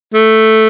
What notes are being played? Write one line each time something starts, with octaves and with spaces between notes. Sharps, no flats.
A3